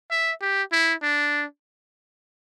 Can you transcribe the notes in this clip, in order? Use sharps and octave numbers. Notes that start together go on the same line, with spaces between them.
E5
G4
E4
D4